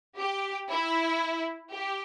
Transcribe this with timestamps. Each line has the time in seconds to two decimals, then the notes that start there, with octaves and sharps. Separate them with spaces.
0.18 G4
0.70 E4
1.73 G4